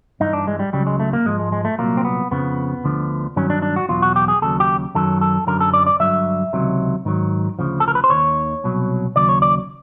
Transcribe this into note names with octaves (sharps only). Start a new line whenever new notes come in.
G2 E3 D#4
D4
G#3
G3
C#2 C#3 F#3 G3
G#3
A3
A#3
G#2 F3 G#3
G#3
G#3
A3
C2 A#2 F#3 A#3
C4
B3
F2 C#3 F3 B3
D2 D3 F3
G2 D#3 F#3 C#4
D4
D4
F#4
E2 B2 F#3 F4
F#4
G4
G#4
D#2 C#3 F#3 A4
G4
F#2 D#3 F#3 A4
A4
F#2 D3 F#3 A#4
A4
D5
D5
G2 D3 F#3 E5
C#2 C3 D#3 F#3
G#2 D#3 F#3
D2 C#3 F3
A4
A#4
B4
C5
D#2 D#3 C#5
C2 B2 F#3
D#2 C#3 F#3 D5
C#5
D5